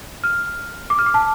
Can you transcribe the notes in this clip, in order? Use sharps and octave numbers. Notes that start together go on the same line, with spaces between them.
F6
D6
F6
D6
A5